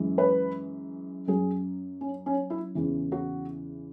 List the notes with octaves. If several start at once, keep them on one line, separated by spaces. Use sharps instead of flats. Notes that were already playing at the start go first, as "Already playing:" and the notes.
Already playing: F#2 E3 G#3
B4
F#2 F#3 G#4
C#4
C#4
E4
E2 C#3 E3
F#4